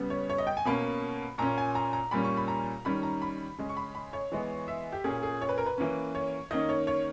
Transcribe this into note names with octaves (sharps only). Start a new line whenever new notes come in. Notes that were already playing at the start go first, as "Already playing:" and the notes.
Already playing: C#3 G3 B3
C#5
C#5
D#5
G5
G#5
B2 A#3 C#4 B5
A#2 A#3 C#4 A#5
G#5
A#5
A#5
A#2 G3 A#3 C#4 B5
C#6
B5
A#5
D#3 G3 C#4 B5
A#5
B5
C#3 G#3 C#4
C#6
B5
B5
C#5
E3 G#3 B3
E5
G4
A#2 A#3 C#4 G#4
G#4
C#5
B4
A#4
B4
E3 A#3 C#4
C#5
D#3 A#3 C#4 D#5
C#5
C#5